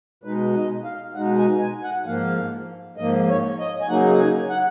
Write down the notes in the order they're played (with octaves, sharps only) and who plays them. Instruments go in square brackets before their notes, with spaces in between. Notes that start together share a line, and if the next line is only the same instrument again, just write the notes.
[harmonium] B2 G#3 D#4 B4
D#5
F5
B2 G#3 D#4 F#5
G#5
G#5
F#5
G#2 F3 A#3 F5
G#2 F3 A#3 D#5
C#5
D#5
G#5
C#3 F#3 A#3 D#4 F#5
G#5
F#5